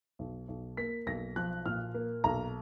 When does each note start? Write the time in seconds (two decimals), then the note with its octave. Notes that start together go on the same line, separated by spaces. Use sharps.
0.19 B1
0.48 B1
0.77 A#3 B6
1.06 B1 A#6
1.36 F3 F#6
1.66 A#2 F6
1.94 A#3
2.24 B1 A#5